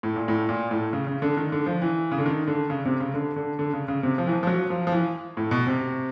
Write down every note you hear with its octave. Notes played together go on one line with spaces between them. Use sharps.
A2
A#2
A2
A#2
A2
C#3
C#3
D3
D#3
D3
F3
E3
C#3
D3
D#3
D3
C#3
C3
C#3
D3
D3
D3
C#3
C#3
C3
F3
E3
F3
F3
F#3
F3
F3
E3
A2
B2
C3